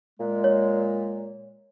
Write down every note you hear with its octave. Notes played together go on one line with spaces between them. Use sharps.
A#2 G#3
C#5